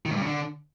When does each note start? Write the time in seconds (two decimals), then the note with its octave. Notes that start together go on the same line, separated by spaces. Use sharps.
0.06 D#3
0.11 G#2
0.16 G2
0.21 C#3
0.27 D3